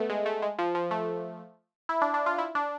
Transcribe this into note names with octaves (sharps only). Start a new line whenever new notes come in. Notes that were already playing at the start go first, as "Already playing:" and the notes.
Already playing: A3 B3
G#3
A3
G#3
F3
F3
A3
E4
D4
D4
F4
E4
D4